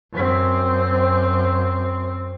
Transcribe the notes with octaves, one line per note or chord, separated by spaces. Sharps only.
F#2 C4